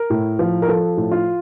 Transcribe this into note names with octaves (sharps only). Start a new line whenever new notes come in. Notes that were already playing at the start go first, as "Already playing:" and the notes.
Already playing: A#4
A2
F3
A#4
F3 A4
A2
F4